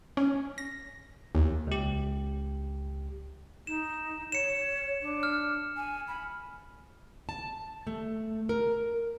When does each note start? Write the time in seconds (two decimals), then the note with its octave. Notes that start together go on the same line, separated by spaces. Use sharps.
0.17 C#4
0.58 A#6
1.35 D#2
1.67 C#2 G4
3.67 D#4 E7
4.32 C#5 C#7 E7
5.02 D4
5.23 F6
5.77 G#5
6.08 B5
7.29 A5
7.87 A3
8.49 A#4